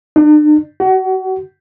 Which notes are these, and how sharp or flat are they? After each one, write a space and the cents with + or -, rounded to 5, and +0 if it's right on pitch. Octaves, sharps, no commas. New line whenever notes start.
D4 +45
F#4 +30